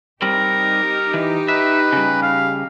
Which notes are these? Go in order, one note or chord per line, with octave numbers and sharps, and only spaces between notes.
G3 C4 D#4 G4 A#4
E3
B4 E5
C#3 G3
F5